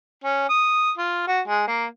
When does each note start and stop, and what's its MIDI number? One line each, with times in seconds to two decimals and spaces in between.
0.24 0.46 61
0.49 0.91 87
0.98 1.23 65
1.28 1.41 66
1.48 1.64 56
1.68 1.86 58